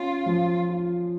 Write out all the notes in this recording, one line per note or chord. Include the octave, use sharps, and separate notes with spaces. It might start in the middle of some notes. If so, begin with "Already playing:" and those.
Already playing: C#4 F4
F3
F4